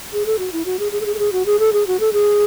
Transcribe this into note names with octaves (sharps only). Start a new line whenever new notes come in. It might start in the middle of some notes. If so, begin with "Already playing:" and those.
G#4
A4
F#4
E4
F#4
G#4
G#4
A4
G#4
A4
G#4
F#4
G#4
A4
G#4
F#4
A4
G#4